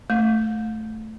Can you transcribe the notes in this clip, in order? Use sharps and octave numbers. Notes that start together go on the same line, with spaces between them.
A3